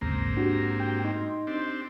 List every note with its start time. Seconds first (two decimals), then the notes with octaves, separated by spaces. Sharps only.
0.01 A#1 D#2 G#2 C#3 A#3 C4 A#5
0.36 D4 F#4 G4
0.80 G5
1.05 D#4 C6
1.47 C4 D4 G4